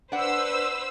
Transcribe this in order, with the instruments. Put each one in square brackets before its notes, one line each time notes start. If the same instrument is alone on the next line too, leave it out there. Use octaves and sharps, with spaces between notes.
[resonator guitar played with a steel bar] D4 F#5 [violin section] B4 C5 E6